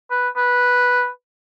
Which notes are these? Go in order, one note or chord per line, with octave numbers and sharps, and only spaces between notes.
B4
B4